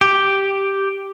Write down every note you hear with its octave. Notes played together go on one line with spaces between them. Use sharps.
G4